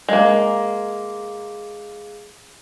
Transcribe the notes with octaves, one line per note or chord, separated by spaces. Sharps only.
G#3 A#3